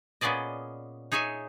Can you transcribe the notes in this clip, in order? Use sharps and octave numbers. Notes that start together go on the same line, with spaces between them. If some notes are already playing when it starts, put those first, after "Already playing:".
A#2 B3 C#4 G#4 D5 D#5
D#4 G#4 C#5 E5 G#5